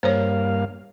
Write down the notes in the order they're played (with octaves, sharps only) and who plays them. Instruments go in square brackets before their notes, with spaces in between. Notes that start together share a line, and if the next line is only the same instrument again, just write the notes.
[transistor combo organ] G2 A#3 F5 [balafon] C5 C#5